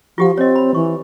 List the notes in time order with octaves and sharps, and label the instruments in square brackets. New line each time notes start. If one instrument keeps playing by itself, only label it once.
[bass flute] F3 [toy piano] F4 G4 F#5
[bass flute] C4 [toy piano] C#5 D#5
[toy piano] B5
[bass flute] E3 [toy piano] C#6